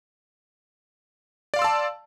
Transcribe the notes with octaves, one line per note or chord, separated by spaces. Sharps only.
D5 F5 A5 C6 E6